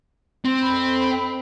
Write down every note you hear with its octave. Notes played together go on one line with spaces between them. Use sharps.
C4
F2 B5